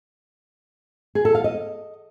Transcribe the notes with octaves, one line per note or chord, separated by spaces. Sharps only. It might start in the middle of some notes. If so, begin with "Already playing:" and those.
G#4
A4
F5
D#5